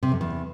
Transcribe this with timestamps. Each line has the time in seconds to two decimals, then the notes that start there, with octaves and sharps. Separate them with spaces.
0.03 C3
0.12 F2
0.21 E2